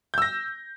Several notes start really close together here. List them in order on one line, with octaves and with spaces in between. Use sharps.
G6 E6 A#6